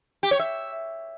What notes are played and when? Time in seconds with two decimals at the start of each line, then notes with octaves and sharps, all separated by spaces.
0.23 G4
0.31 C#5
0.39 E5